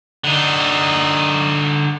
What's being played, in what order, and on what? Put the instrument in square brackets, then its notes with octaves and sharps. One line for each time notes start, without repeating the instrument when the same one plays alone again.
[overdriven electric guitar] D3 D#4